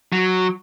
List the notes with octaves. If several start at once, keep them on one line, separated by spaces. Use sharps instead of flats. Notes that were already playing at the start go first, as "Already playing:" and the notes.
F#3